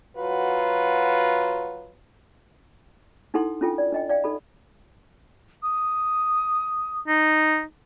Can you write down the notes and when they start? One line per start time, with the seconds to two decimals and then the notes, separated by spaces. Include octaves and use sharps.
0.17 F#3 F4 F#4 B4
3.34 D#4 E4 A4 F#5 C6
3.61 C#4 D4 F4 A4 G5
3.78 D5
3.92 D4 D#5 G5
4.10 D5 F5 G5
4.24 D#4 A4 B5
5.63 D#6
7.08 D#4